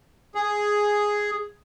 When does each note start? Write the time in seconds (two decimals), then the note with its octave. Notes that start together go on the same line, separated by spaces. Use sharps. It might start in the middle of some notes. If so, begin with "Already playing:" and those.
0.35 G#4